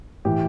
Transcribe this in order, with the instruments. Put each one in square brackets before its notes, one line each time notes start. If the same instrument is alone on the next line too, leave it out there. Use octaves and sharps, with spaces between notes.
[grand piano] A2 E3 G4